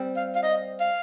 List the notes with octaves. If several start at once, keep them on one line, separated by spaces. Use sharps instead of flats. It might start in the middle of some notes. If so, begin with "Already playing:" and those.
Already playing: G3 C4
F5
F5
D#5
F5